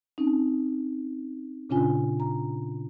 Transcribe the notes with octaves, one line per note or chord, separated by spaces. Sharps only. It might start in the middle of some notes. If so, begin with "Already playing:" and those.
C4 C#4 D#4
A#2 C#3 C#4 D4 F4 G#5
A#5